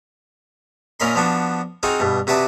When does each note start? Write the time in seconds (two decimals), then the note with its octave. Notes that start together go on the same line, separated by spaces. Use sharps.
1.00 A#2 C#4 A#4 D#5 B5 C6
1.15 F3 B3 D4 F#4
1.83 C4 D#4 F4 F#4 G#4
2.00 G2 B2
2.27 C3 F#4 B4 D5 A5 D#6